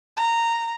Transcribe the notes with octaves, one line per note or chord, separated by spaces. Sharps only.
A#5